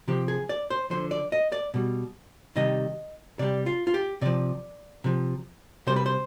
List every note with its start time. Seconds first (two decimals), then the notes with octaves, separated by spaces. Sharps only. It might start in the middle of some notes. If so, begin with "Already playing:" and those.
0.08 C3 F3 G4
0.28 G#4
0.49 D5
0.70 C5
0.90 D3 F3 C5
1.11 D5
1.32 D#5
1.52 D5
1.74 B2 G3
2.56 C3 D#3 G3 D#5
3.39 C3 G3 D5
3.66 F4
3.87 F4
3.94 G4
4.21 C3 F3 D5
5.04 C3 F3
5.87 C3 G3 C5
5.96 B4
6.06 C5